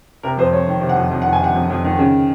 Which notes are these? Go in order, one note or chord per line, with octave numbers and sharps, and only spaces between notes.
C3 A#4
F2 C5
F2 C#5
D#3
C3
F#5
F2
F2
F#5
D#3
G#5
C3 F#5
F2
F2
D#3
C#3